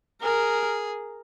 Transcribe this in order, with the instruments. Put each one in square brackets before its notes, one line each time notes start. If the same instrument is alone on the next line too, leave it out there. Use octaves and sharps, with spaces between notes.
[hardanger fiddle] G#4 [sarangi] A#4